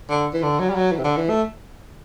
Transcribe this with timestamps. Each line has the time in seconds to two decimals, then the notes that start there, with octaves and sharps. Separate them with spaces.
0.10 D3
0.33 E3
0.43 D3
0.59 F#3
0.70 G3
0.76 F#3
0.92 E3
0.99 C3
1.04 D3
1.17 E3
1.29 A3